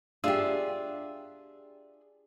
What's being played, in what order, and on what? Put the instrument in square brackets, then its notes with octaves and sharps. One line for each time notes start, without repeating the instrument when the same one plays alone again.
[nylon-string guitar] D4 G4 [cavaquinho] F4 G#4 E5